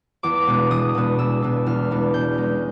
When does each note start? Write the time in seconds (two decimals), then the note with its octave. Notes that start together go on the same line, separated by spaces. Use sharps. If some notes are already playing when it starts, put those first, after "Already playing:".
0.23 E2 D6
0.47 B2 G#3 B3 D4
0.70 E2 D#6
0.95 B2 G#3 B3 D4
1.18 E2 E6
1.42 B2 G#3 B3 D4
1.66 E2 F6
1.91 B2 G#3 B3 D4
2.14 B2 G6
2.38 G#3 C#4